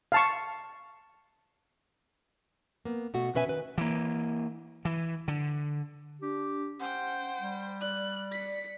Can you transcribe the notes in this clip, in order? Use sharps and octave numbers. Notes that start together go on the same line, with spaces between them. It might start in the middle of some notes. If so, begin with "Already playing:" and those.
F5 A5 C#6
A#3 B3
B2 A3 F#4
B2 C#4 B4 E5 G#5
D#3 B4
E3 A#3
E3
D3
D4 G4
C#4 C5 F#5 G5
G3
D5 F#6
B6 C#7